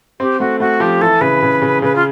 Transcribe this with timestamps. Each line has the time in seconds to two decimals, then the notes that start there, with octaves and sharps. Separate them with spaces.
0.20 C4 G4
0.40 A3 F#4
0.60 A3 F#4
0.80 F3 G4
1.01 E3 A4
1.21 C#3 B4
1.42 C#3
1.62 C#3
1.82 C#3 B4
1.95 F4